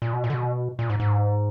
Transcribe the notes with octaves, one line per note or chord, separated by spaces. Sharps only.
A#2
B2
A#2
D3
B2
A#2
G#2
G#2